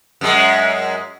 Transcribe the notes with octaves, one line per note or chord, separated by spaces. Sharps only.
F#2 G#3